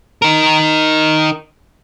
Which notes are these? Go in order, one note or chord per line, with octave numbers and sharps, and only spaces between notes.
D#4 A#4